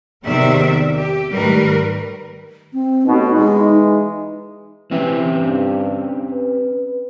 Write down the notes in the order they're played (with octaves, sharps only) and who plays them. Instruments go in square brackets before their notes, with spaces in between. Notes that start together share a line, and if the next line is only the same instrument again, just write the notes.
[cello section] E2 C3 D#3 A#4 D5 E5
G4
G#2 D#3 G3 A3 A#4 B4
[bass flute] C4
[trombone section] A1 B2 [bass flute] D#4
[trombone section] E3 G#3 [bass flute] D#4
[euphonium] E3 [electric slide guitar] C4 C#4 G4
[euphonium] G2
B4